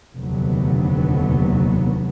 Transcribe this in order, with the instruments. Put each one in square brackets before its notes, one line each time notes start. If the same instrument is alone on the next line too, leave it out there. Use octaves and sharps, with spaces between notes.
[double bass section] F1 D#2 D3 F#3 B3